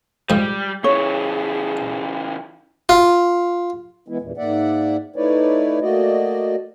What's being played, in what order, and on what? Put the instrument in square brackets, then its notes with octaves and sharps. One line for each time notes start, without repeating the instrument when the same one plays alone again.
[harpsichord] G#2 F3 [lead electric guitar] G3
[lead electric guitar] C#3 E3 [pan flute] G#4 [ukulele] C#5
[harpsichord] F4
[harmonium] E3 G#3 B3 E4
E2 G2 A#2 E3
G#2 A#3 D5 E5 F#5
A3 D#4 E4 B4 C#5 D5
A3 A#3 F#4 D5 D#5